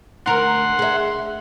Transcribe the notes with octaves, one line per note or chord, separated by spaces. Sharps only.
D2 A#4 F#5 C6
G#4 E5